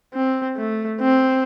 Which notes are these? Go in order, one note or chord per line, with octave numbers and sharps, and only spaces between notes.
C4
A3
C4